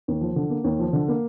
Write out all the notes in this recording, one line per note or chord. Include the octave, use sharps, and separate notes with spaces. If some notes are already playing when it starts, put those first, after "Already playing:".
D#2
F3
D3
A#3
D#2
F3
D3
A#3